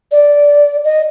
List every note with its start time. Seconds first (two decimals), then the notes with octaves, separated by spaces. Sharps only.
0.12 D5
0.85 D#5